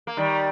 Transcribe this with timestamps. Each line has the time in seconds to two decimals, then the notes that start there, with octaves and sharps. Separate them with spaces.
0.07 A#3
0.17 D#3 G3